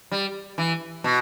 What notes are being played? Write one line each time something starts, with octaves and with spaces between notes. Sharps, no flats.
G3
E3
B2